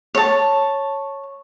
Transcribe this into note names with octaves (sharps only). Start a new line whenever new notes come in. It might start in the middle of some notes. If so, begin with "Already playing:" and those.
C#5 A5